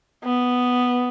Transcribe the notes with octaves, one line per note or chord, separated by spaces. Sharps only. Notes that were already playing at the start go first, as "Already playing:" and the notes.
B3